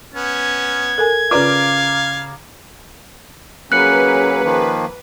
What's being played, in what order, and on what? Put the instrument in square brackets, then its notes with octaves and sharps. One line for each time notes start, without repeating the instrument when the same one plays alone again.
[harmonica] B3 C#4 [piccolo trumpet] G#6
[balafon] A4 A#4 G#5
[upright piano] C#3 A#5 D6 [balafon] F4 B4 D5 [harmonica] F5
[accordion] F#3 A#3 [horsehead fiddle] C#4 G#4 [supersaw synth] B4 [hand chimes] F#6 C#7
[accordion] D#3 F3 A#3